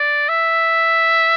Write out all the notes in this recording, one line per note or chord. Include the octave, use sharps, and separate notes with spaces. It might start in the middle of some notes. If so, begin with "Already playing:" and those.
Already playing: D5
E5